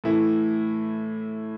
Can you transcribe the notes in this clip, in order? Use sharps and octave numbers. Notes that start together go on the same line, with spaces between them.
A2 E3 E4